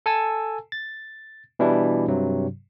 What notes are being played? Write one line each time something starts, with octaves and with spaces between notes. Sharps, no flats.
A4 G#5 A5 E6
A6
B2 E3 G3 D4 E4
G2 C3 F#3